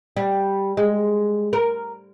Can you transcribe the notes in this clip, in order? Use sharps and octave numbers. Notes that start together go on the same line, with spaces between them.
G3
G#3
A#4